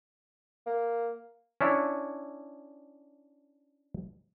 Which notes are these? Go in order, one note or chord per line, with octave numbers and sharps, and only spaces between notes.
A#3
C#4 D4 E4 C#5